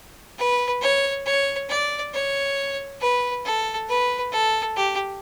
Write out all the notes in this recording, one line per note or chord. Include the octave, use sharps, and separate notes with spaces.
B4
C#5
C#5
D5
C#5
B4
A4
B4
A4
G4